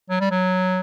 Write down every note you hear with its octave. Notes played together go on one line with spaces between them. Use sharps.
F#3
G3
F#3